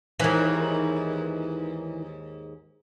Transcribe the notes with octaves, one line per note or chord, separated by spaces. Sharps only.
D#2 G#2 D#3 E3